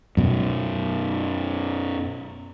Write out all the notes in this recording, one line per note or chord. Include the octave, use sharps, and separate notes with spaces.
F#2 B2